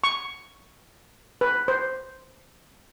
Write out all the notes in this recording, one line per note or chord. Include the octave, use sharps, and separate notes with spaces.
C#6
B4
C5